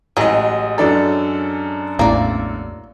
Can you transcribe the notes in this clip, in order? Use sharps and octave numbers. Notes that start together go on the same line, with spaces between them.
A1 F#3 G#3 D#5
F#2 D4 A4
A1 E2 A#3 D5